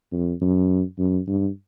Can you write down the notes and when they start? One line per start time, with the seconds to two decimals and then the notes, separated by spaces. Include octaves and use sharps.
0.12 F2
0.41 F#2
0.98 F#2
1.27 G2